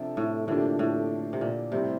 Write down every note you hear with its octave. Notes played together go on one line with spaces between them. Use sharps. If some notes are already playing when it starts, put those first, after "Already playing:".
Already playing: C3 F3 D4 A4
A2
A2 D3 F3 A#3 D4 G4
A2
C3
A#2
A2 C3 G3 C4 G4